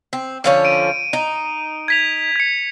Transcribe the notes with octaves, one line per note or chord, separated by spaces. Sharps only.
C4
D3 F3 C#4
D7 D#7
D#4
G#6 B6 F7
G#6 C#7